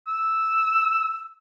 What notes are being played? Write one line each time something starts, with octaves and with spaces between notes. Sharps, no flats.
E6